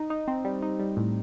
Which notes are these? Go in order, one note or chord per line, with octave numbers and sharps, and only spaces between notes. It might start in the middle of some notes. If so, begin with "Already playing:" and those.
Already playing: D#4
D#4
C4
G3
D#4
G3
A2